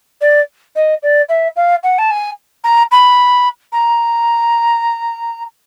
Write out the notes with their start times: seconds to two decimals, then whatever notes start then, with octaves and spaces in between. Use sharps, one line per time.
0.21 D5
0.75 D#5
1.02 D5
1.29 E5
1.56 F5
1.83 F#5
1.98 A5
2.10 G#5
2.64 A#5
2.91 B5
3.72 A#5